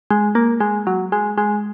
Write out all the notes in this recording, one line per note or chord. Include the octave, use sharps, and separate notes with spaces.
G#3
A#3
G#3
F#3
G#3
G#3